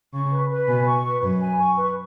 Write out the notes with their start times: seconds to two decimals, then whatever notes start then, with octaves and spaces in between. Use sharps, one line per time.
0.13 C#3 C#6
0.32 B4
0.50 B4
0.68 B2 G#5
0.86 C#6
1.04 B4
1.22 F#2 B4
1.40 G#5
1.60 C#6
1.78 B4